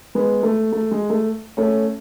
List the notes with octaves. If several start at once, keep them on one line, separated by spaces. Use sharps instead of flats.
G#3 B3
A3
A3
G#3
A3
A3 C#4